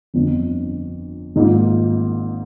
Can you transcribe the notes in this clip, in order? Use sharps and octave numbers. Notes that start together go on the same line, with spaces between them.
G1 F2 D3
G#1 G#2 D#3 A#3 F4